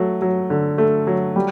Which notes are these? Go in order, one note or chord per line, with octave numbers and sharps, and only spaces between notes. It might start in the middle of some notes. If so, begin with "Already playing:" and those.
Already playing: F#3 A3
F#3
D3
A3
F#3
G3